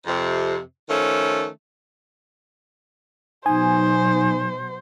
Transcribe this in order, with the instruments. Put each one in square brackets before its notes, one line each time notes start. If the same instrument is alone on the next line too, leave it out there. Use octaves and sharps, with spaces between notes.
[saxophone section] F2 C3
D#3 F3 A3 C#4
[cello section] B2 F#3 [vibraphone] D#4 [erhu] C5 [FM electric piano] G#5